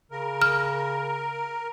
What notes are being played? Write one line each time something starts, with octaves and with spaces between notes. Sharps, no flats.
C#3 A#4
F6